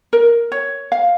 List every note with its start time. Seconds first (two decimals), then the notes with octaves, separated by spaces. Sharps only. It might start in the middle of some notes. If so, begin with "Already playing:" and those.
0.13 A#4
0.52 C#5
0.92 F5